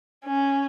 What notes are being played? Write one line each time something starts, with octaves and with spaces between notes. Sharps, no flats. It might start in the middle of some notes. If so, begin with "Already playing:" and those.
C#4